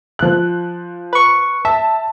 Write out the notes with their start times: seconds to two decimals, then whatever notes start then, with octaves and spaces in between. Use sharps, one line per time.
0.19 F3 F#6
1.13 B4 C#6
1.65 E5 A5